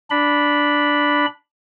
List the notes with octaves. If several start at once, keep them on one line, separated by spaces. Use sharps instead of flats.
D4 B5